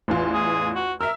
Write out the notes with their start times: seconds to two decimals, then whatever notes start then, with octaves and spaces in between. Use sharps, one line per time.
0.08 A1 E2 F4
0.34 G#4
0.75 F#4
1.01 A#4 E5 E6